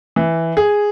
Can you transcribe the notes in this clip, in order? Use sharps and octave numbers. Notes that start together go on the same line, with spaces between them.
E3
G#4